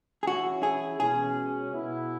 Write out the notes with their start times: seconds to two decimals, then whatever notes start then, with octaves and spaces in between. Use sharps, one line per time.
0.23 G#4
0.27 E3 C#4 E4 F#4
0.63 G#4
1.00 B2 G#3 C#4 G#4
1.72 B2 B3 E4